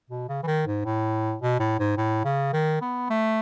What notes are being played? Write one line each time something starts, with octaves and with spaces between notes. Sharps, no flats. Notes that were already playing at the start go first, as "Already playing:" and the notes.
B2
C#3
E3
D#3
G#2
A2
B2
A2
G#2
A2
C#3
D#3
B3
A3